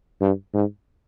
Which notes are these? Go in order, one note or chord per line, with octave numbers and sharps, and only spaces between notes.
G2
G#2